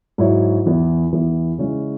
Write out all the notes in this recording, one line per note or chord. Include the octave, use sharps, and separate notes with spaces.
G#2 F#3 E4 C#5
E2 E3 B3
E2 E3 B3
C#3 G#3 C#4 E4